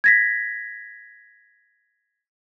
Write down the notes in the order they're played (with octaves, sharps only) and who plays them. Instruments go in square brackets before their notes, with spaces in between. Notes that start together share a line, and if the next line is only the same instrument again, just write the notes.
[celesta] G#6 A#6 B6